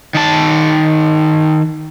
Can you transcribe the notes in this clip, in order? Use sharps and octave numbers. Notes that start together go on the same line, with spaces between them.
D#3 A5